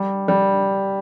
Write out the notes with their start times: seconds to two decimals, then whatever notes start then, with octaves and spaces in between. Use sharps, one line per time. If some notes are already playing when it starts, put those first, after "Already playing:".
Already playing: G3
0.28 G3